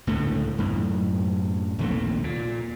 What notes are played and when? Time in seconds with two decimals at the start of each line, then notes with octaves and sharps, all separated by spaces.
0.07 C#2 A2 D3 A3
0.58 F#2 A2
1.79 A#1 D#2 C3 A3
2.24 A#2